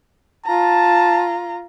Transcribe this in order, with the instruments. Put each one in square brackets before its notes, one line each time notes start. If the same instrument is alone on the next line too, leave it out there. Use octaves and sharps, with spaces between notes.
[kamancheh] F4 A#5 [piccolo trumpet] A5